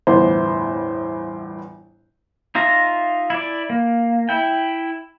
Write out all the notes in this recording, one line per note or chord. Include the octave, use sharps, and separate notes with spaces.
G1 E2 A2 B3 E4 C5
D#4 F4 E5 A#5
E4 D5
A#3
E4 G5